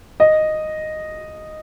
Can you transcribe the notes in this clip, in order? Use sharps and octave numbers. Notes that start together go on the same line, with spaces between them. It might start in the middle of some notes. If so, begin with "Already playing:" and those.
D#5